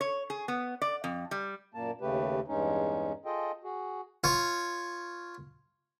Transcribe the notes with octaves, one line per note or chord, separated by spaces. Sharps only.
C#5
G#4
B3
D5
F2
G3
F#2 A#2 A#3 A5
D#2 C#3 A3 G4 B4
E2 G2 G#3 C#4 D#4
F4 G#4 A4 D#5 G5
F#4 G#4
F4 C#5